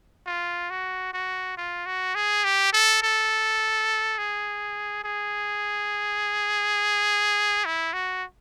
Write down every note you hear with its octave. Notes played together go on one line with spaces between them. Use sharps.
F4
F#4
F#4
F4
F#4
G#4
G4
A4
A4
G#4
G#4
E4
F#4